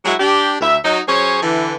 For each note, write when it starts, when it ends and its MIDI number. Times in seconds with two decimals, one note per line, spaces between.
0.05 0.14 54
0.05 0.14 56
0.05 0.14 64
0.05 0.14 66
0.20 0.56 62
0.20 0.56 67
0.61 0.76 38
0.61 0.76 76
0.84 0.99 54
0.84 0.99 63
1.08 1.40 54
1.08 1.40 61
1.08 1.40 68
1.08 1.40 72
1.08 1.40 73
1.42 1.74 50
1.42 1.74 52